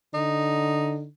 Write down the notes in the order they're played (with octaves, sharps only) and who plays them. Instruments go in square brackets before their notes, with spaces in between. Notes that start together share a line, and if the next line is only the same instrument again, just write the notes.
[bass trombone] D3 [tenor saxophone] D#4